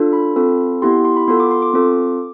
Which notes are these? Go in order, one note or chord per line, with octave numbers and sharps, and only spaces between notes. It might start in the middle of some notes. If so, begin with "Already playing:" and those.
Already playing: D4 F4 A4
B5
C4 F4 A4
B3 E4 G4 C6
C6
B5
B3 F4 A4 C6
D6
C6
D6
C4 F4 A4